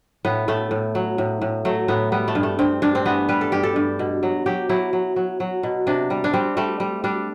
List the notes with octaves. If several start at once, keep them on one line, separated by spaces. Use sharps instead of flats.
A2 B3
A2 A3
A2
F#3
A2
A2
F#3 A3
A2 B3
G3 B3
A3
G2
A3
G2 C4
G2 D4
C4
E3 B3
G3 B4
A4
G2 G4
A4
G2
B2
F#3
F#3 G4
F#3 E4
F#3
F#3
F#3
B2
C3 D4
G3
D4
G3 C4
G3 A3
G3
G3 D4